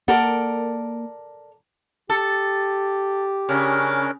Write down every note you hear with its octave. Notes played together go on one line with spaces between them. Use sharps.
A#3 A4 A#4 D5 F#5
G4 A4
C#3 C#4 D4 A#4